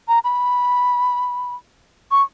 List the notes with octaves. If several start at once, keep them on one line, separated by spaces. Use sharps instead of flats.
A#5
B5
C#6